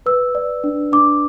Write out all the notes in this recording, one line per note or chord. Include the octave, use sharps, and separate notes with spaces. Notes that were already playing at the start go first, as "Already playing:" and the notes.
B4 E6
D5
D4
D4 D6